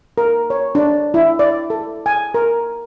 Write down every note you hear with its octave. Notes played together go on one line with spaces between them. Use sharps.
A#4
C#5
D4
E4
D5
A4
G#5
A#4